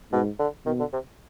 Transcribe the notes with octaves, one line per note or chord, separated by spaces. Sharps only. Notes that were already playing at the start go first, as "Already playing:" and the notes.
G#2 B2
D3
B2 D#3
D3
C3